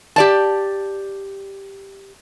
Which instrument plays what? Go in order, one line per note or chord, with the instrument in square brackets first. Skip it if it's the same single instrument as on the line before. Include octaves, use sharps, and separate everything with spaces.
[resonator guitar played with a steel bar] G4 D5 A5